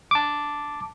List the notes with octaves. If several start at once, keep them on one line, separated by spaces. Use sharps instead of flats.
A5 D6